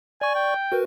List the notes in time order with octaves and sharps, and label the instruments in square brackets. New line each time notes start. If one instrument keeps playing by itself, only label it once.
[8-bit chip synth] D5 C#6 [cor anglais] G#5
[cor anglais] G5
[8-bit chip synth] F#4 A#4 B4